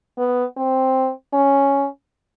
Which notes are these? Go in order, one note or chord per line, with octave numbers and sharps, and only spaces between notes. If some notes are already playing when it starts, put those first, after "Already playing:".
B3
C4
C#4